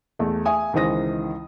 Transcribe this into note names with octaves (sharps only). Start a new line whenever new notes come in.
E2 A3
E5 G#5 D#6
C#2 D#3 E3 C5 D#6 A#6